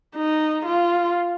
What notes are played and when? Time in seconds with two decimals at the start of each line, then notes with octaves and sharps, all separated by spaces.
0.16 D#4
0.65 F4